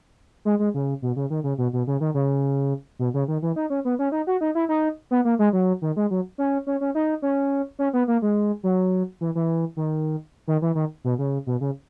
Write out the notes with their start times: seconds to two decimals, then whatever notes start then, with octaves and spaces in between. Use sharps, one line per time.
0.45 G#3
0.59 G#3
0.74 C#3
1.02 B2
1.16 C#3
1.30 D#3
1.44 C#3
1.58 B2
1.73 B2
1.87 C#3
2.01 D#3
2.14 C#3
2.99 B2
3.14 C#3
3.28 D#3
3.42 E3
3.56 D#4
3.70 C#4
3.85 B3
3.99 C#4
4.12 D#4
4.27 F#4
4.41 D#4
4.55 E4
4.69 D#4
5.11 B3
5.25 A#3
5.39 G#3
5.53 F#3
5.82 D#3
5.96 G#3
6.11 F#3
6.38 C#4
6.67 C#4
6.81 C#4
6.95 D#4
7.22 C#4
7.79 C#4
7.93 B3
8.08 A#3
8.22 G#3
8.63 F#3
9.21 E3
9.35 E3
9.77 D#3
10.48 D#3
10.62 E3
10.75 D#3
11.04 B2
11.19 C#3
11.47 B2
11.61 C#3